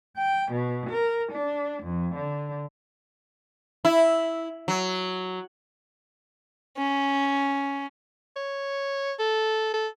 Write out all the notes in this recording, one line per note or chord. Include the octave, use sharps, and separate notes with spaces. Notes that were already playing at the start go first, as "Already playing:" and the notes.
G5
B2
A#4
D4
F2
D3
E4
F#3
C#4
C#5
A4
A4